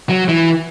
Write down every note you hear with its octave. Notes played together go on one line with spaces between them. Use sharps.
F#3
E3